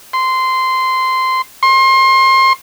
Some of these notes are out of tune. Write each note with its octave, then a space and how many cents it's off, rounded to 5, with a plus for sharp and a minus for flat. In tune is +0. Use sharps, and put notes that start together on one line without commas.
C6 -10
C6 +30